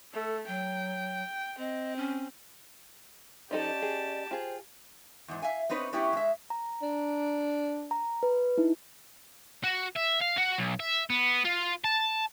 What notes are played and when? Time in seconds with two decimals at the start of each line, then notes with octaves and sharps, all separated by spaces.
0.13 A3 A4
0.47 F#3 G5
1.59 C4 D#5
1.96 C#4
3.51 F3 C#4 D#4 G4 A4 D5 D#5 A5
3.82 G#4
4.31 F4 G#4 C5 G5
5.28 E2 G#2
5.42 E5 F5 G#5
5.69 B3 C4 D#4 B4 C#5
5.92 G3 B3 C#4 E4 G4
6.13 G#3 E5
6.50 A#5
6.82 D4
7.91 A#5
8.23 B4
8.58 D#4 E4
9.64 F#4
9.96 E5
10.21 F5
10.37 F#4
10.58 B1
10.80 E5
11.10 B3
11.44 F4
11.84 A5